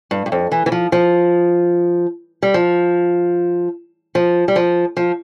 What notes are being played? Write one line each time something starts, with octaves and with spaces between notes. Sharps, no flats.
G2
G2
F2
E3
E3
F3
F3
G3
F3
F3
G3
F3
F3